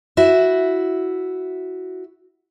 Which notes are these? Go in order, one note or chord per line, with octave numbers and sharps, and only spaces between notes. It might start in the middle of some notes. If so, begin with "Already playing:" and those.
E4 F#4 E5